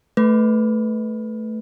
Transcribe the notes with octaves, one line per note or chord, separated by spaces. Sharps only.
A3 B4